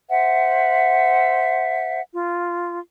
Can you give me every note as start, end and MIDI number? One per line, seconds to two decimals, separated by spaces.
0.09 2.00 72
0.09 2.00 76
0.09 2.00 78
2.12 2.78 65